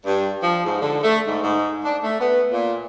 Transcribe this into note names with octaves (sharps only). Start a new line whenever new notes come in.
G2
F3
G#2
D3
A3
G#2
G#2
D4
A3
B3
A#2